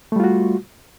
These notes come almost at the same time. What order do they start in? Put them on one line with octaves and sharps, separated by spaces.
A3 G3 F4 F#4